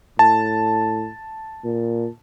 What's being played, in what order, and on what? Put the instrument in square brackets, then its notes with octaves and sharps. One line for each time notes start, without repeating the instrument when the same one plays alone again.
[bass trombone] A2 [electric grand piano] A5
[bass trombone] A#2